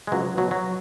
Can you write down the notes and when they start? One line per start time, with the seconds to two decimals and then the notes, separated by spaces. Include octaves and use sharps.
0.07 G#3
0.12 C#2 F#3
0.25 F#3
0.37 B2 F#3
0.51 F#3